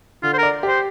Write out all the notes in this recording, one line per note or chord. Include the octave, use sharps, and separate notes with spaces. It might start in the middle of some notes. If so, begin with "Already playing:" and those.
D3 F4
C5
A#4 D5
G4 C5